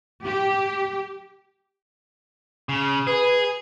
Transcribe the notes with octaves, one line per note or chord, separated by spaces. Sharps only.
G4
C#3
G#4 B4